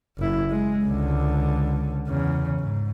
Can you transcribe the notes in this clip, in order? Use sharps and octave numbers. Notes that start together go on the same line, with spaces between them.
F#1 E4
G#3
C#2 D3
E2 C#3
G#2